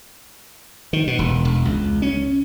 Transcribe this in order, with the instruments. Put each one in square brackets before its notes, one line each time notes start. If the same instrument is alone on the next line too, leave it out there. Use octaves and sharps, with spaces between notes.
[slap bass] D#3
B2
E1
E1
C#2
C#4